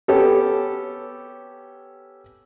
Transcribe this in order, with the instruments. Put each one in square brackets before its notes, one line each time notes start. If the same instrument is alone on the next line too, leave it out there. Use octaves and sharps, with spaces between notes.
[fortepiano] B3 C#4 G4 A4